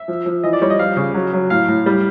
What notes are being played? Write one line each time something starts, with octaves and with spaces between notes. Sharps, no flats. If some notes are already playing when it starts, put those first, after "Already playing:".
Already playing: E5
F3
F3
E3 D#5
D5
G3 C#5
D#5
F3 F5
C#3
F#3
F#3
A2 F5
A2
G3